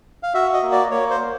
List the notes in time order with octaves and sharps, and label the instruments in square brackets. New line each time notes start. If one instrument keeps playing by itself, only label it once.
[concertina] F5
F#4 E5
D#5
A#3
D5
A#3 C#5
C5
A#3